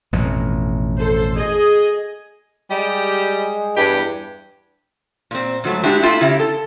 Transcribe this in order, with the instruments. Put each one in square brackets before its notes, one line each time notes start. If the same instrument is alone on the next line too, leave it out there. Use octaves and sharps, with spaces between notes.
[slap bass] A1 F2 B2
[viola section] A4 C5
G#4 D#5
[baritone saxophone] G3 [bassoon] G#3 [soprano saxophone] G4
[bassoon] E2 [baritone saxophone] G2 [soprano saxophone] G4
[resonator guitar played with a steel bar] A#2 C4
G#2 F#3 A3
G#3 D4 E4 F#4 G4
A3 A#3 E4 F4 G5
C#3 E4 G4
A4